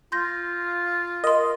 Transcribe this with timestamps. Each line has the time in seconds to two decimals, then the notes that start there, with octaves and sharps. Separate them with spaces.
0.12 F4 C6 G6 A#6
1.24 A#4 D#5 C6